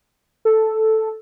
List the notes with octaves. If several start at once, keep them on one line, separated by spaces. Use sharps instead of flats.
A4